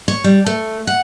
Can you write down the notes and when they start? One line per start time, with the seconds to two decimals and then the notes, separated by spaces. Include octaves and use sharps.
0.08 C#5
0.24 G3
0.46 A3
0.87 F#5